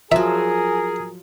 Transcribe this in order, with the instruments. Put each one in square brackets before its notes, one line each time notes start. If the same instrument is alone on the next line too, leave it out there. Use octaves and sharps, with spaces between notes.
[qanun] F3 F#3 [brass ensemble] G#4 [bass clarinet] A#4 [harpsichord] E5